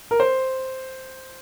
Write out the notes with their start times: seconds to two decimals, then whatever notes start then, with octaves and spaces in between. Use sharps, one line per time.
0.11 A#4
0.20 C5